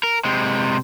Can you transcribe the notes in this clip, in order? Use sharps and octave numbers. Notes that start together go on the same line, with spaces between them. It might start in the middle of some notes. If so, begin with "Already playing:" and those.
A#4
C3 G#3